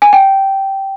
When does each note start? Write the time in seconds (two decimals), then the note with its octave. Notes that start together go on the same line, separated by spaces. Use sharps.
0.02 G#5
0.13 G5